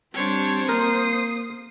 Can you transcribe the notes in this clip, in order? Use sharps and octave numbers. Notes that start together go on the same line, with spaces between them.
G3 C4 D4 C5 C#5
A#3 A#4 D#6 C7